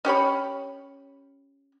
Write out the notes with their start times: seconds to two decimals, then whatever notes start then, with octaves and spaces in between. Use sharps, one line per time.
0.05 C#4 G4 C#5 B5